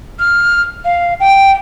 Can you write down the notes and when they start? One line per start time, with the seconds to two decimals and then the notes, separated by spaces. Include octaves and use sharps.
0.19 F6
0.85 F5
1.20 G5